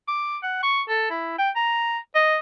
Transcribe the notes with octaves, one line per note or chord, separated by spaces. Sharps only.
D6
F#5
C#6
A4
E4
G5
A#5
D#5